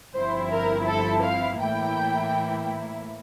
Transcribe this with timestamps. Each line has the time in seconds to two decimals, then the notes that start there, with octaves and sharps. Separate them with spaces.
0.14 G1 G2 F3 C4 E4 C5
0.50 A#4
0.87 A4
1.24 F5
1.60 A2 E3 A#3 E4 G5